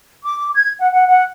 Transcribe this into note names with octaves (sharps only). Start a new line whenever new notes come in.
D6
G#6
F#5
F#5
F#5